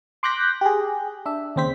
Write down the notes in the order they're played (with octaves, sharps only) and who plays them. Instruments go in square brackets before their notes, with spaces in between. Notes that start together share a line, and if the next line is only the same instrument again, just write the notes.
[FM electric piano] C6 D6 F#6 G6 A#6 B6
G4 G#4
D4 E5
D#2 C#3 C4 C5 B6